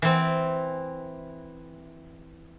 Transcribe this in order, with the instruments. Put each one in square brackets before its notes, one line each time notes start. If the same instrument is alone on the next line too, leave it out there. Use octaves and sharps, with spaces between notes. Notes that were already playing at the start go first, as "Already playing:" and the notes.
[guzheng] E3 C4